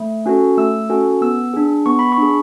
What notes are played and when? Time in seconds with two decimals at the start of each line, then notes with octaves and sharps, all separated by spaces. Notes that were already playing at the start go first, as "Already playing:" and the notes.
Already playing: A3
0.26 C#4 F#4 A4
0.58 A3 E6
0.90 C#4 F#4 A4
1.21 B3 E6
1.54 D4 G#4
1.86 B3 C#6
1.99 B5
2.12 C#6
2.18 D4 G#4